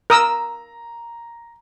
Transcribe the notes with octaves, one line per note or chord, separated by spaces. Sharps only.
A#4 A#5 D#6 E6